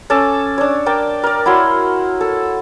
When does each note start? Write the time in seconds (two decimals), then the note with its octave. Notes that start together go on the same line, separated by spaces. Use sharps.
0.10 C#4 A4 A5 D6
0.58 D4 C#5
0.86 A#4 D5 G5 A5
1.23 A#4 D5
1.46 E4 F#4 C#5 C6
2.21 A4